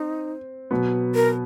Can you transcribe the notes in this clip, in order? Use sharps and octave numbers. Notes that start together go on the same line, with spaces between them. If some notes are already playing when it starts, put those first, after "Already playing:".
Already playing: C4 D#4
B2 F#3 B3
A#4